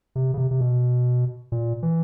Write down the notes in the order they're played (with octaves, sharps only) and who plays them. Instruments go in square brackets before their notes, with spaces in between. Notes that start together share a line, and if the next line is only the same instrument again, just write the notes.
[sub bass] C3
C#3
C3
C3
B2
A#2
E3